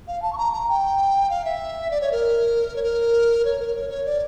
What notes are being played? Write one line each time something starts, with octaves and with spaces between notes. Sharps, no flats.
F5
A5
C#6
A#5
A#5
G5
F5
E5
D5
C#5
A#4
C#5
A#4
C#5
A#4
C#5
C#5
D5